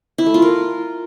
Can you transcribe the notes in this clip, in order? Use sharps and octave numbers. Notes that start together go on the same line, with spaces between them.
E4
A3
F4
A#4